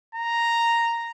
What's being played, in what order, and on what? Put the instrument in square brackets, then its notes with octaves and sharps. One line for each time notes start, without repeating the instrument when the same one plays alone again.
[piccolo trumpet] A#5